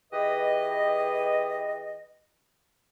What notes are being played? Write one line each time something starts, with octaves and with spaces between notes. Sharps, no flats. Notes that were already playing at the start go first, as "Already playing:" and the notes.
E3 G4 G#4 B4 D#5